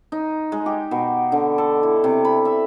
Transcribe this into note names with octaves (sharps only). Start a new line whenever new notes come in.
D#4
G#3
G4
B2
D3
A4
E4
C3
B5
E5